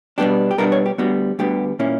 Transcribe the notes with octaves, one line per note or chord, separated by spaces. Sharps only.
B2 G3 B3 D4 G4
G4
B2 G3 B3 D4 A#4
C#5
G4
D2 D3 G3 B3 F#4
D2 D3 G3 B3 G4
A#2 A#3 C#4 E4